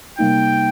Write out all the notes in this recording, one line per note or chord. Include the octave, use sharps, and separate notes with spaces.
C3 G3 A#3 D#4 G5